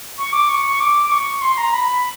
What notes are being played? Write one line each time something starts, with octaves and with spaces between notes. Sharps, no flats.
C#6
D6
C#6
C#6
D6
D6
C#6
C6
A#5
B5